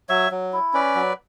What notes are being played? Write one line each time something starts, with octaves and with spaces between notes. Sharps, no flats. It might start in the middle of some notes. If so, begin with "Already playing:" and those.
F#3 C#5 E5
F#3
E4
C#4 B4 D5
F#3